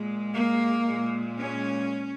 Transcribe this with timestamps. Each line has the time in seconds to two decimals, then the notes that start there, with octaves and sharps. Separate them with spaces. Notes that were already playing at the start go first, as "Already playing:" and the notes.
Already playing: A#2 G#3
0.34 A#3
0.86 A#2 G#3
1.38 C#4